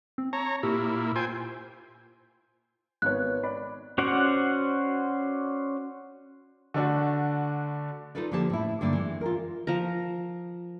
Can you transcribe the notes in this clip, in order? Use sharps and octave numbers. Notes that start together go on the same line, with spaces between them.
C4
C#5 A5 A#5
A#2 E4 G4
F4 C5 G5 G#5
G#1 B3 C#5 F#6
D5 B5
C#4 F#4 C5 D5 F#5
D3 A3 D4 F#4
D#4 F4 A4 B4 D5
D3 F3 A#3 G4 A5
A2 E4
G2 D3 A#3 D5
E3 G#3
F4 A#4
F3 A#4